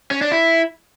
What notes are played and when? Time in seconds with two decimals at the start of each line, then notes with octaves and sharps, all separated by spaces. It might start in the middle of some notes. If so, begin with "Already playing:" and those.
0.11 C#4
0.21 D4
0.32 E4